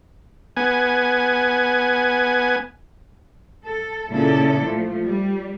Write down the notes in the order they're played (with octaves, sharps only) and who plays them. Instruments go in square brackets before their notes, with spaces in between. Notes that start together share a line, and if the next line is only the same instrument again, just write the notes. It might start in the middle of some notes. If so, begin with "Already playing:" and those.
[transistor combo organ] B3 G#5
[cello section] A4
A#2 C#3 C#4 D4 E4 A4
F3 A3
G3